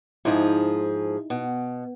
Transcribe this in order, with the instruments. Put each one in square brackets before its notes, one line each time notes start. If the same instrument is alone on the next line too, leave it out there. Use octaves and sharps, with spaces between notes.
[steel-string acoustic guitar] G#2 F3 G#4 [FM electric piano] D#4 E4
[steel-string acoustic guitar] B2